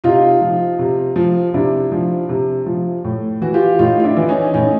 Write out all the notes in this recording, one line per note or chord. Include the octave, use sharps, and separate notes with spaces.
C3 D#4 F4
F3
C3
F3
C3 D4 E4
F3
C3
F3
A2
E3 F#4
F4 G4
A2 D#4 F4
F4
D4 E4
E3
C#4 D#4
A2 C#4 D#4